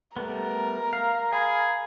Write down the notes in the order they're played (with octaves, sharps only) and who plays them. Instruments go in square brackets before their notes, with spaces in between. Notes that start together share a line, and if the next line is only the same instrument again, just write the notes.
[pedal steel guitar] G3 A3 B3 [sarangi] A#4
[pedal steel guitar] F5 [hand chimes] C7
[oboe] G#4 [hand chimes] F5 B5 [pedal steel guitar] G#5